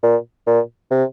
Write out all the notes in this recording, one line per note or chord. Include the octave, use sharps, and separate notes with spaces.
A#2
A#2
C3